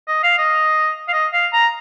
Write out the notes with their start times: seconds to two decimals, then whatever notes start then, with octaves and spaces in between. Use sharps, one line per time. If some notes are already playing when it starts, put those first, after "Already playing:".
0.08 D#5
0.23 F5
0.39 D#5
1.08 F5
1.13 D#5
1.33 F5
1.53 A#5